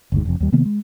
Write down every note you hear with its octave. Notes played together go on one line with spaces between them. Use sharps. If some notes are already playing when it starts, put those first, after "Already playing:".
F#1 D2 G#2
F1 F2
D#2 G3
C3 D#3 A#3 B3
G#3